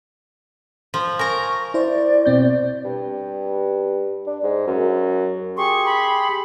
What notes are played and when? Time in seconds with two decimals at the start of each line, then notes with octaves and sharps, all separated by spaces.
0.94 F3
1.19 A#4 G#5 A#5 C#6
1.74 E4 C5 D5
2.26 B2 C4 G6
2.84 G2
4.27 D4
4.43 G#2
4.67 F#2
5.57 G4 G#4 C6 C#6
5.86 B5